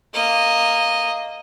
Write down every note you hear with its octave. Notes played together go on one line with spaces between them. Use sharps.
A#3 D#5